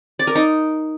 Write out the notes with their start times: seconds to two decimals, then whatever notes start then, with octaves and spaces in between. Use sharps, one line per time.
0.19 D5
0.27 A#4
0.35 D#4